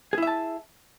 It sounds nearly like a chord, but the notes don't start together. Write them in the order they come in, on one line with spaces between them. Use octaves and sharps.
G#4 E4 E5 A5